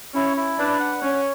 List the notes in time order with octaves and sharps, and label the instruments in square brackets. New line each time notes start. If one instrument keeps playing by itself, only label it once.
[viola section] C#4 [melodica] E4
[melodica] E4
[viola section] D4 [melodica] B4
[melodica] F#5
[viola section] C#4 [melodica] C#5